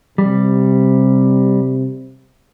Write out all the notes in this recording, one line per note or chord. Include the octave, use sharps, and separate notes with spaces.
C3 G3